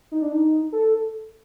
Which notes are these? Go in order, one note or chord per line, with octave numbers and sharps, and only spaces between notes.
D#4
D4
D#4
A4